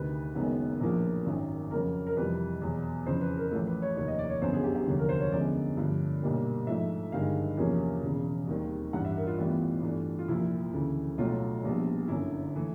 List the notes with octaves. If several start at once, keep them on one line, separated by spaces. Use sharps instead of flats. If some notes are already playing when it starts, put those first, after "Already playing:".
Already playing: D2 C3 D#3 B4
F#1 F#2 D#3 G#3 B3
A#1 A2 F3 A#3
G#1 F#2 D#3
F2 C#3 F#3 A#4
A#4
F2 C3 E3 G3 B4
E2 B2 F#3
F2 C#3 E3 C5
B4
A#4
A1 A2 F3 A3 A4
B4
C#5
F1 D#2 D#3 C#5
D#5
D5
C#5
G1 F#2 D3 F#3 B3 C5
G#4
G4
G4
F1 D#2 D3 F#3
A#4
C5
C#5
F#2 D3 F3 G#3 B3 D5
G2 D3 F3 A3
B1 A#2 G3 A#3 D4
G#2 F3 A3 D4 E5
G1 G2 D#3 G#3 F5
E2 C3 F3 A#3 C#4
E1 E2 C#3
D#2 D#3 G3 C4
A1 G2 E3 F#5
E5
A#4
F4
A1 A2 E3 G3 B3 F4
G2 E3 A3 D4
F4
C2 A#2 F3 E4
D2 C#3 E3 A3
B1 A2 F#3 A3 F4
A#1 A#2 G3 B3
G1 F#2 D3 E4
E3 A3